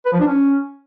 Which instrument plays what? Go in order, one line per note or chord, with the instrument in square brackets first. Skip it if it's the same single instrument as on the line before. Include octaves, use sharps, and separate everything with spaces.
[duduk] B4
F3
D4
C#4